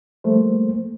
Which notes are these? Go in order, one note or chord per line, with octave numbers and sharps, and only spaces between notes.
F3 G3 A3 A#3 C5